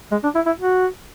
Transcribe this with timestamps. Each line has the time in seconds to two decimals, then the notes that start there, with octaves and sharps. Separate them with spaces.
0.11 G#3
0.23 D4
0.35 E4
0.46 E4
0.58 F#4